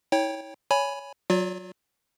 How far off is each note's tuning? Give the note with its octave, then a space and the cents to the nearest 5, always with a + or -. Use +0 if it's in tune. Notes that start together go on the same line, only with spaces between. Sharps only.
E4 -40 C#5 +0 G5 +10
C#5 +15 G#5 +0 B5 +0
F#3 +0 F4 +45 D5 -30